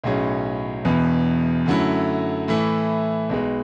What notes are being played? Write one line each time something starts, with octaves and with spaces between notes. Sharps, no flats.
B1 A2 F#3 C#4 G#4
E1 E2 B2
F#2 D3 F#3 A3 E4
A2 E3 A3 E4
B1 B2 G#3